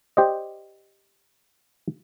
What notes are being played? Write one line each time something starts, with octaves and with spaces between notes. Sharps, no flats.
G4 C5 D5 D#5